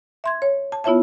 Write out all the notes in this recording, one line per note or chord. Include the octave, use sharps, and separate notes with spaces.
E5 C6 G#6
C#5
A5
B3 E4 F4 C#5 E5 A5